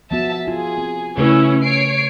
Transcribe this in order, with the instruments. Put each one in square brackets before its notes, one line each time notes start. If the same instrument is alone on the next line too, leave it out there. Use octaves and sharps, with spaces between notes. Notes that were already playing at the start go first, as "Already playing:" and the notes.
[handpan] F3 B3 F#4 [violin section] E5 A5
[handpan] F4 [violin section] G#4
[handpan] C4
[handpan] C#3 A3 B4 [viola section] C#4 E4
[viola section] C#5 [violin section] C7 D7